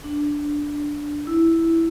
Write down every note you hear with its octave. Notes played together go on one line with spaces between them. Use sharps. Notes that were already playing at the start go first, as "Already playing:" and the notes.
D4
E4